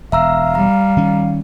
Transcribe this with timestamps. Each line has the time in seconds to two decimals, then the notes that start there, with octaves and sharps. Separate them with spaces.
0.12 E1 E5 F5 A#5 E6
0.55 G3 A#5
0.97 D#3 C#4